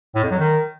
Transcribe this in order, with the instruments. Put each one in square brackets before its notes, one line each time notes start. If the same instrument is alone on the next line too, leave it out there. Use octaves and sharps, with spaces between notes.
[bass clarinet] A2
F2
F#3
D#3